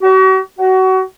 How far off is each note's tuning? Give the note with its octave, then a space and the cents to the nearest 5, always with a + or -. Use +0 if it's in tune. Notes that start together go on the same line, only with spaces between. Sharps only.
F#4 +40
F#4 +25